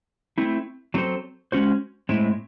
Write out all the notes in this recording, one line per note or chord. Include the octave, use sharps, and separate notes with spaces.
A3 C4 E4
F#3 C4 F#4 A4 C5
G#3 C#4 F#4 C5
A2 G#3 C4 E4